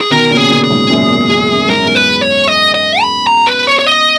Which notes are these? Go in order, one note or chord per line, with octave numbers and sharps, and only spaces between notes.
G#4
B2 D#3 A#4
A#2 C#3
G#4
A#2 C#3
G#4
G#2 B2
F#2 A#2
E2
E2
F#2
G#2 A#4
F#2
E2 G#2
B4
C#5
D#5
D#5
B5
A#5
B4
C#5
C#5
D#5